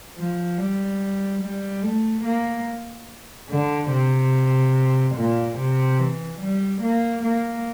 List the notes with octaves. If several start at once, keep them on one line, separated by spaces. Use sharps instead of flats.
F3
G3
G3
A3
A#3
D3
C3
A#2
C3
E3
G3
A#3
A#3